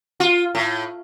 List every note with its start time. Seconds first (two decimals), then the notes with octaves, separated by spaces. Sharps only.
0.20 F4
0.55 A2